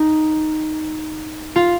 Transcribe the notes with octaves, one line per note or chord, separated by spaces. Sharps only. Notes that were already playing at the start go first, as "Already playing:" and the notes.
Already playing: D#4
F4